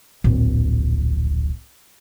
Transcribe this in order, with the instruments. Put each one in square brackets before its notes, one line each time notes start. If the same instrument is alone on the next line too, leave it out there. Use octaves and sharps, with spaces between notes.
[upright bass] D1 A#1